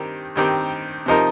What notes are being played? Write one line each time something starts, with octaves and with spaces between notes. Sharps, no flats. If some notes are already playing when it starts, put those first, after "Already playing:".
Already playing: G2 D#3 C4 G4 A#4
G2 D#3 C4 G4 A#4
C3 F3 D#4 A#4